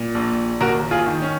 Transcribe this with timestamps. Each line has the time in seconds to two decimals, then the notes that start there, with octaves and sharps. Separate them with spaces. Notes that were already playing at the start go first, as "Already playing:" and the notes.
Already playing: A#2
0.15 A#1
0.61 D#2 F#4 A#4
0.91 F4 G#4
1.06 D#3
1.22 C#4